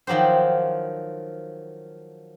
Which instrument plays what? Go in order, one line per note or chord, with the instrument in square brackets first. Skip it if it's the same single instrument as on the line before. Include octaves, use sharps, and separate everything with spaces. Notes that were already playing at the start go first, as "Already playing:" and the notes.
[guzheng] D#3 F3 F#3 G4 C5